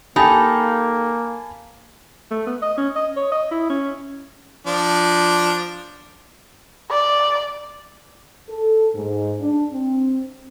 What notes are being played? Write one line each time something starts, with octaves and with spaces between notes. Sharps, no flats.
A#3 D#4 G4 A4 G#5 A5 B5
A3
B3
D#5
C#4
D#5
C#5
D#5
E4
C#4
F3 D4
D5
A4
G#2
D4
C4